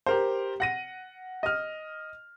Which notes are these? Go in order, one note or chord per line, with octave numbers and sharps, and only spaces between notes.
G4 A#4 C5
F#5 A#6 D#7
D#5 F6